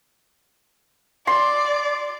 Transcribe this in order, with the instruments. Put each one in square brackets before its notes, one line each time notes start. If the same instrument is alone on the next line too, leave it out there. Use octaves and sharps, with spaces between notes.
[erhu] D5 [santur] C6